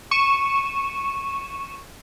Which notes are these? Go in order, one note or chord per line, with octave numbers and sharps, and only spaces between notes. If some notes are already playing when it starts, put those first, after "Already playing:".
C#6 D#7 E7